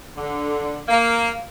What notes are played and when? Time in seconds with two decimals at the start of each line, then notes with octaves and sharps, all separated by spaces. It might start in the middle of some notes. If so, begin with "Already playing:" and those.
0.17 D3
0.88 A#3